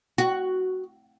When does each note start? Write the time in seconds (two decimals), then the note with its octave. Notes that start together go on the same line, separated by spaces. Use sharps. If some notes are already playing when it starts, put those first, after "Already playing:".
0.18 F#4